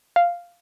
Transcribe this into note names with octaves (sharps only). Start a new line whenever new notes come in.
F5